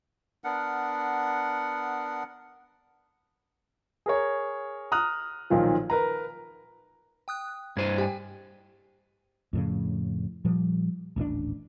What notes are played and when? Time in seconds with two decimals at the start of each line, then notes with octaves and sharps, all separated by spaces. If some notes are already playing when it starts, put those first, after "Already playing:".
0.44 B3 D4 A#4 F#5
4.06 G#4 A#4 C#5
4.92 A#5 D#6 F6 F#6
5.50 B1 A#2 D#3 F3
5.90 A#4 B4 A#5
7.28 G5 D#6 F#6
7.77 G2 C5 G#6 D#7
7.98 G4 G5 G#5
9.53 F2 A2 C#3
10.45 A#2 F3 G3
11.16 D#1 A1 G2 D4